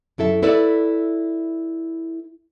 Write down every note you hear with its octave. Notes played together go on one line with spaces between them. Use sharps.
F#2 E4 A4 E5
E4 A4 B4 D5 E5